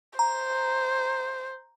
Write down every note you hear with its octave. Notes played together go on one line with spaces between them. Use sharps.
C5 A#5